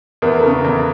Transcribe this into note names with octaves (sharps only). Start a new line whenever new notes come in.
E2 B4
A#4
A4
C#3 A#4
E2